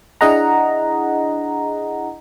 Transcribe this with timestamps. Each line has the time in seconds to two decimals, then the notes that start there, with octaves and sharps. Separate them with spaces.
0.21 D4 E4 G#4 D#5 F#5 A#5